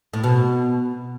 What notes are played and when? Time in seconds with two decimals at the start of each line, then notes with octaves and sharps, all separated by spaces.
0.14 A2
0.24 B2